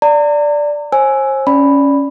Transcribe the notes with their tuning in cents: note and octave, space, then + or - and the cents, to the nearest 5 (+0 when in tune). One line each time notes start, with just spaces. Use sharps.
D5 +0 A#5 -40
C5 +40 G#5 +10 E6 +0
C#4 +0 D5 +0 B5 +0